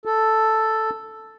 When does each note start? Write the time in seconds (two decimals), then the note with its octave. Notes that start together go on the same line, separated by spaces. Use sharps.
0.05 A4